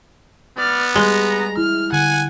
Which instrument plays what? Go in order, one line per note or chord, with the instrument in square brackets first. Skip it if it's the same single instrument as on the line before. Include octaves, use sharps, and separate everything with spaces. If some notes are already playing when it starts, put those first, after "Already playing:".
[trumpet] B3 [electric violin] D5 F6
[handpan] G3 G#4 [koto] G#3 [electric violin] A#5
[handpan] E4 [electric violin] F6
[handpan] D3 [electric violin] F#5 [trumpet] G#5